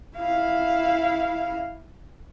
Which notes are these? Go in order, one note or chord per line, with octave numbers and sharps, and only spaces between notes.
E4 F5